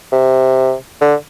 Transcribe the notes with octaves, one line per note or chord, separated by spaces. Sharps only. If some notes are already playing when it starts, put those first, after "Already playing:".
C3
D3